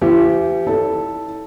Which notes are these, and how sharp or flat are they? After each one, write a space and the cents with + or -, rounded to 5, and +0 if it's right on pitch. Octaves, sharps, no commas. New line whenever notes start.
E3 +45 G4 -10 E5 +35
E4 -35 A4 +0 C#5 +45